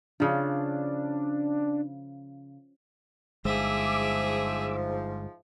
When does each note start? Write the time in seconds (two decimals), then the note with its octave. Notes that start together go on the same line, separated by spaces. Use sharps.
0.20 C#3 F3 D4
3.45 G1 G#2 F3 G#3 G#4 E5 D6 E6